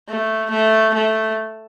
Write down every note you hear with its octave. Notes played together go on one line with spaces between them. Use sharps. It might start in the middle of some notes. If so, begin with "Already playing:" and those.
A3
A3
A3